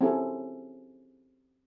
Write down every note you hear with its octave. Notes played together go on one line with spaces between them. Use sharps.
C4 C#4 E4 F#4 G#4 A4